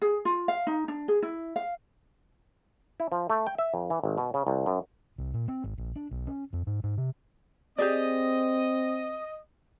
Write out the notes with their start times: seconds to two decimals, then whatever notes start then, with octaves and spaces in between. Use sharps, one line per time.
0.02 G#4
0.25 F4
0.48 F5
0.67 D#4
0.88 D4
1.08 G#4
1.22 E4
1.56 F5
3.00 E4
3.12 F3
3.30 A3
3.47 G5
3.58 E5
3.74 F2
3.90 E3
4.04 G#1
4.18 B2
4.34 C#3
4.47 C2
4.66 F#2
5.18 C2
5.34 A#2
5.48 C4
5.64 G#1
5.78 A#1
5.96 D4
6.11 B1
6.27 C#4
6.53 F2
6.67 G#2
6.83 G#2
6.97 C3
7.78 C4 G4 G#4 D5 D#5